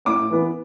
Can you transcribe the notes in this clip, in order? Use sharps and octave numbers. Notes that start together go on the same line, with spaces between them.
A2 D6
E3 B3